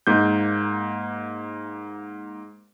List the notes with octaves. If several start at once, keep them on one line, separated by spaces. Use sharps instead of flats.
G#2 A#3 G6